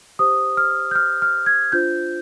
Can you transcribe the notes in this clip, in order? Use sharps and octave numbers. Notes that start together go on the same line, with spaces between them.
G4 C5 D#6
F6
G6
F6
F6
G#6
D4 F4 C5 G6